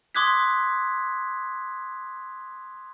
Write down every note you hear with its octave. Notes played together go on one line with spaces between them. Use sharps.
C6 D6 D#6 F#6 G#6 B6